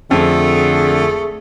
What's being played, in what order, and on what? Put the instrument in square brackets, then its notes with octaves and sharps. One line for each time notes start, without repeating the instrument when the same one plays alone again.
[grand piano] F2 [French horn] D3 [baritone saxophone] A3 [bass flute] G#4